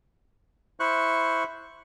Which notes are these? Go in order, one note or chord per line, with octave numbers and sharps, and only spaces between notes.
E4 C5 C#6 F#6